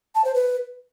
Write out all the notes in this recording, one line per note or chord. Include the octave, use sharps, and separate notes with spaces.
A5
C5
B4